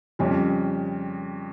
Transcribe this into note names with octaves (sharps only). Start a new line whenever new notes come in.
F2 C#3 G3 C#4